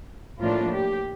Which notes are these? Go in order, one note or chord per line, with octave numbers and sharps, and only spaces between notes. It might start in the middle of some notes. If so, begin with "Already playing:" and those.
A2 F3 A#3 D4 F4
G4